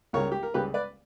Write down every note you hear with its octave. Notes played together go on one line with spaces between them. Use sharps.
C#2 C#3 G3 A#4 C#5
G4
A#4
C#2 C#3 G3 G4 B4
B4 D5